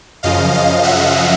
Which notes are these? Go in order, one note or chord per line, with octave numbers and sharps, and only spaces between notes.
F#2 C#3 F3 D#5 F5
D#5 F5
E5 F#5